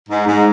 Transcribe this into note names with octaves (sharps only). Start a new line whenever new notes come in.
G#2
G#2